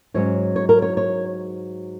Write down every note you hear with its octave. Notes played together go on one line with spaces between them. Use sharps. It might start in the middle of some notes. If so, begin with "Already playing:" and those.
G#2 F#3 C#4 C#5
C#5
A#4
C#5
C#5